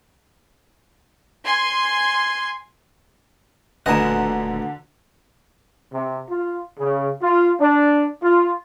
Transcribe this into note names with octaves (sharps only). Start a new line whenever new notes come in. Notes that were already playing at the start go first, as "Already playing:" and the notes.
G#5 C6
D#1 D2 D3 B4 D#5 G#5 A#5 E7
C3
F4
C#3
F4
D4
F4